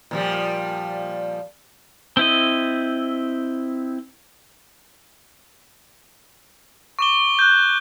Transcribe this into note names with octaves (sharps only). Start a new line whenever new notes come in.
A#2 F3 G3
C4 E4 D#5
C#6 D6 G7
F#6 G6